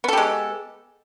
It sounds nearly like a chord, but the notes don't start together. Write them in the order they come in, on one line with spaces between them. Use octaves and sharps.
B3 A4 G4 G#3